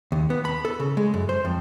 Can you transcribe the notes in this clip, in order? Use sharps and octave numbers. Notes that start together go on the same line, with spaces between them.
D#2
B3
B5
A4
C#3
G#3
F#2
C5
F2